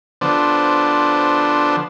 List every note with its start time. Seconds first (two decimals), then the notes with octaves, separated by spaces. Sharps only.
0.21 D3 F3 B3 D4 C5